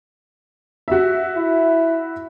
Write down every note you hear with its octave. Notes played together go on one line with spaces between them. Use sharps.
F#4 E5
E4